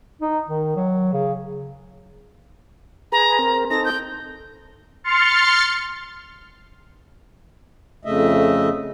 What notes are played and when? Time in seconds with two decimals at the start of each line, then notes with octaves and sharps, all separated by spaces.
0.21 D#4
0.48 D#3
0.76 F#3
1.13 C#3
3.12 G#4 B4 A#5
3.39 C4 A#4
3.70 C4 D#4 A4 A#6
3.85 G6
5.04 C6 F6 A6 C#7
8.05 F2 C#3 A3 D#5 E5